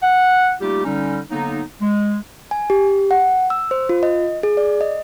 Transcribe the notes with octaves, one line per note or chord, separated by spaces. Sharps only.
F#5
G3 A3 A#3 D#4 F4 G4
D3 G3 C#4 D#4
D3 F#3 A#3 B3 D#4
G#3
G#5
G4
F#5
E6
C5
F4
D#5
G#4
D5
D#5